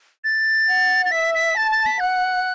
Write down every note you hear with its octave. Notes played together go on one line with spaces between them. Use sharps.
A6
F#5
A6
E5 B6
B6
A5 A6
A6
B6
F#5 F#6